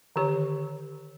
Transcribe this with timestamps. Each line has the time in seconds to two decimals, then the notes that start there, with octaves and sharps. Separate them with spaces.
0.16 D3 D#3 G4 C#5